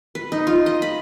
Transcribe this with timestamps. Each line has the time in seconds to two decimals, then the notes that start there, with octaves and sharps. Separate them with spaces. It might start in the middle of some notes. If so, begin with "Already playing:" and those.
0.15 B4
0.32 D#4
0.47 F4
0.66 D#5
0.82 B5